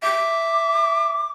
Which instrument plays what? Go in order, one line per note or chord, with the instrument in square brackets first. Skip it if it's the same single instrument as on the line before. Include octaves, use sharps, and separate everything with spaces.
[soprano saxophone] E5 [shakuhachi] D6